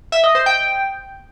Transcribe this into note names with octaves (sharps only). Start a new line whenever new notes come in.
E5
D#5
C5
G5